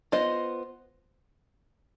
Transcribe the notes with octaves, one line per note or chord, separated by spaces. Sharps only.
B3 F4 C5 D#5